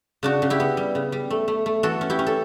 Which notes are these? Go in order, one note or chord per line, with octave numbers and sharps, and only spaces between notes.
C#3 D4 F#4
C#3
E4 G4
B3
G3
C#3
G3
A3
A3
A3
E3 F#4 A4
C#4
E4 G4
C#4
A4